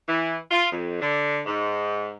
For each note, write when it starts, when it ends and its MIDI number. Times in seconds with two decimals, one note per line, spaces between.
0.07 0.37 52
0.51 0.70 65
0.70 0.99 41
1.01 1.41 50
1.46 2.16 44